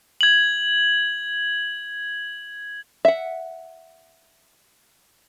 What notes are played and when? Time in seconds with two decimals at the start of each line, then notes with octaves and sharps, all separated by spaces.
0.21 G#6 F#7
3.05 E5 F#5